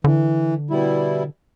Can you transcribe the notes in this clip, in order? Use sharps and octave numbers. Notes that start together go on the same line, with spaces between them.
D3 E3
B2 G3 E4